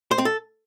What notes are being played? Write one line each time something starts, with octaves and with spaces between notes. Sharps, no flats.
C5
C4
A4